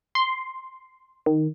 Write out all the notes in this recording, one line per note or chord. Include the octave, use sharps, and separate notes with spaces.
C6
D#3